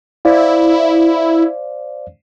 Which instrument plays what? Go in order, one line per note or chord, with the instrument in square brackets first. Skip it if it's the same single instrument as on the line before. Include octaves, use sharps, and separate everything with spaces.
[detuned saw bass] E4 [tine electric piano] C5 D5 F5